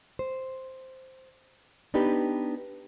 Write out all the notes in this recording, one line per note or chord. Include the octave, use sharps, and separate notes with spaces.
C5
B3 D4 D#4 G4 B4